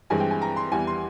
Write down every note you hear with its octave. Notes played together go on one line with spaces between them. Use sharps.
G2 E3 G#3 C4 G#5
G5
G#5
A#5
C6
E2 E3 G3 G#5
C6